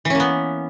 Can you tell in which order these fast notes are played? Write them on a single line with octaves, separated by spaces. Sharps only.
E3 C#4 A#3 B3